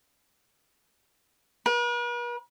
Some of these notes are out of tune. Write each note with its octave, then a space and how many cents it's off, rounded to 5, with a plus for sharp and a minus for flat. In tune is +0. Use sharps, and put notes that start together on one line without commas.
B4 -45